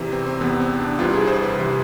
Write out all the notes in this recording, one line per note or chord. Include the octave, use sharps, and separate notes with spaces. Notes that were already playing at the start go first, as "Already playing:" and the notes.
Already playing: E2 C3 E3
C4
C4
E2 C3 E3 B3
C4
D4
C2 C3 E3 F4
G#4
C5
B4
C2 C3 E3